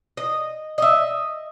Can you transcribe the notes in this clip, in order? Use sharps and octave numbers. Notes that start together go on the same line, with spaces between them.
D#5
D#5 E5